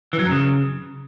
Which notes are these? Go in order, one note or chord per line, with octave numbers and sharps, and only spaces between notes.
E3
F#3
F#2
C#3